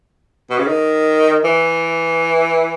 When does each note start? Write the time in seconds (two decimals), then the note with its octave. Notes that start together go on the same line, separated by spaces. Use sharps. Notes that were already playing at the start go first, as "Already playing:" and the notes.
0.50 B2
0.58 C#3
0.67 D#3
1.44 E3